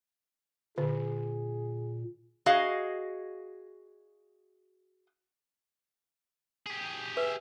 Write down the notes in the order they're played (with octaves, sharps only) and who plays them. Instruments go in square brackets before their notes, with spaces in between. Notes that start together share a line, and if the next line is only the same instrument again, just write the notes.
[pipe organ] A#2 [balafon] D3 [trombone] G#4
[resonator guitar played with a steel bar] F#4 G#4 D#5 F5
[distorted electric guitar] G4 G#4
[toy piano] B4 [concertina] E5